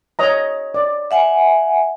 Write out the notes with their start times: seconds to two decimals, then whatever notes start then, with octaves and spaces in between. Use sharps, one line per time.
0.19 C#5 D#5 A#5
0.74 D5
1.11 E5 F#5 G#5